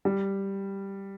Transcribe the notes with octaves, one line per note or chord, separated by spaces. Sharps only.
G3